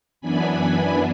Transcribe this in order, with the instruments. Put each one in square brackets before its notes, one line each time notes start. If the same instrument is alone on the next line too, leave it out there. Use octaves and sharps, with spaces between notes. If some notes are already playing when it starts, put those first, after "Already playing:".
[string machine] F#2 E3 B3 D4 G#5 B5